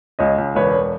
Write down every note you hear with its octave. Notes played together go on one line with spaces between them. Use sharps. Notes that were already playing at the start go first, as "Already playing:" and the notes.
C#2 C#5 D#5
C#2
E1 B4 C#5